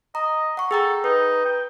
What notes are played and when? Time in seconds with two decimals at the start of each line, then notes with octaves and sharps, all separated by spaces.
0.15 D#5 A#5
0.57 F#5 C#6
0.71 G#4 A4 G5 A#5
1.04 D#4 B4
1.45 G5